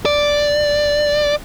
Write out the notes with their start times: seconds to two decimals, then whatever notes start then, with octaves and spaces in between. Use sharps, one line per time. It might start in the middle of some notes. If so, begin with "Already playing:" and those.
0.05 D5